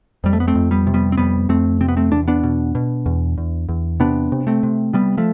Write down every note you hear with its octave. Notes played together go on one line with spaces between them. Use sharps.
F2 G3
A3
B3
A3 C4
F2
G3 B3
C3
G3 B3
C4
F2 G3 B3
F2 A3 C4
C3 C4
B3
A3 C4
E2 D4
B3 D4
B2
B2
E2
E2
E2
C3 B3 D4
C3
A3 C4
C3
C3 G3 B3
F3 A3